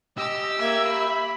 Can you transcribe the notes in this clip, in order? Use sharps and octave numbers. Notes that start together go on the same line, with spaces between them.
G4 D#5 E6
A#3 E5 G#6
B5